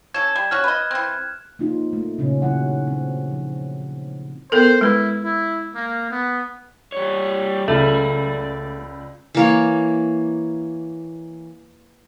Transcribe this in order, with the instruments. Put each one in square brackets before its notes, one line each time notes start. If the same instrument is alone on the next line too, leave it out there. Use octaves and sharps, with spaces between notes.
[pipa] C#4 A4 [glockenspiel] G#6 E7
[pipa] G3
[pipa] C#4 F#4 C#5 [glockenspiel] F6 F#6
[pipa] B4 D#5
E3 C4
[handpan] A#3 C4 D#4 F4
A3
A#2 C#3 C#4
D#3 F#3 E4 F#5
C4
F3
[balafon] B3 A4 A#4 [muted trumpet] C5
[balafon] G#3 B4 [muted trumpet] E4
[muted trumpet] E4
A#3
B3
[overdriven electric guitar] G3 C#5
[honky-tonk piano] C#2 [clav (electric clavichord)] A3 [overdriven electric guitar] D5 B5
[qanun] E3 A#3 C#5